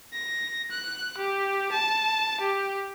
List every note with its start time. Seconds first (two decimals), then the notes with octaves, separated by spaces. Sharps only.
0.13 A#6
0.71 F#6
1.18 G4
1.72 A5
2.40 G4